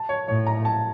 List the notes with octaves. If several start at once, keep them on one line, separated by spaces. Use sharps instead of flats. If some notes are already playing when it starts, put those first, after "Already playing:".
Already playing: A5
C#5
A2 C#5
A#5
A5